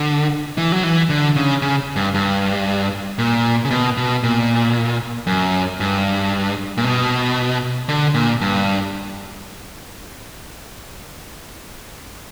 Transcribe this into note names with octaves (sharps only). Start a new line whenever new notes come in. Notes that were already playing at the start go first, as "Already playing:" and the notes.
Already playing: D3
E3
F#3
E3
D3
C#3
C#3
G2
G2
A#2
C#3
B2
B2
A#2
F#2
G2
A#2
B2
D3
A#2
G2